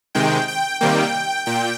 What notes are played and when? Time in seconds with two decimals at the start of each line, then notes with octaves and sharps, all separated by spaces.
0.15 C3 D#3 G#3 G5
0.48 G5
0.81 C3 D#3 G3 A#3 G5
1.46 A#2 G5